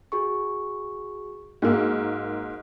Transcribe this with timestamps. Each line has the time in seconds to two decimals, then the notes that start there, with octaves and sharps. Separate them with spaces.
0.12 F#4 G#4 C#6
1.62 G#2 A#3 F#4 G#4 E6